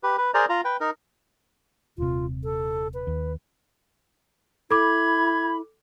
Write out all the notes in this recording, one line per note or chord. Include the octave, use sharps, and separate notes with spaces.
G4 B4
B4
G#4 A#4 C5 D5 A#5
F4 A#5
B4 G5
D#4 A#4
D#1 C3 F4
A4
B4
D#2
E4 A4 B5 D6 G#6